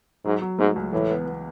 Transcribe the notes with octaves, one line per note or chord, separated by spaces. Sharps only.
G#2 F#3
F#3
G#2 A3
C#2
A2 E3
B3
B3